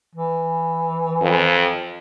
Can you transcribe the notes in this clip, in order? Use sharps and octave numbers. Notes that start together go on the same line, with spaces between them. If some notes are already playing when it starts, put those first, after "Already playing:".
E3
F2